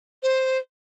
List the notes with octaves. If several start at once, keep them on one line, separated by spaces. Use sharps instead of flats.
C5